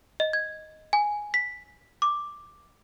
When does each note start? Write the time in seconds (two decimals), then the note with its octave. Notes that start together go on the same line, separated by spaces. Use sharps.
0.20 D#5
0.33 G#6
0.93 G#5
1.34 B6
2.02 D6